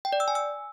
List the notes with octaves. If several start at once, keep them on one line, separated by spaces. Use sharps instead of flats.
G5
D5
E6
G#5
E6